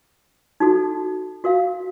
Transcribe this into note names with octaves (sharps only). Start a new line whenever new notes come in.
D#4 F#4 A4
F#4 A#4 F5